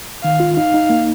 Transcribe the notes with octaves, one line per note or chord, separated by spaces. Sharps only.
D#3 F5
F4
D#4 F5
D#4
A#3